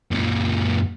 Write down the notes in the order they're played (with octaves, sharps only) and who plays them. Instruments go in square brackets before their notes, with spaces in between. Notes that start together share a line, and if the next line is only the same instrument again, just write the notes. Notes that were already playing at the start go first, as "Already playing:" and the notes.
[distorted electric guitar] F#2 A#2